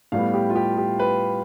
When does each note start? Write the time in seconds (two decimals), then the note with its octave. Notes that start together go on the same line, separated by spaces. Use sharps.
0.12 A2 G3 B3 F5
0.34 G4
0.50 F4
0.56 G4
0.77 G4
0.99 B4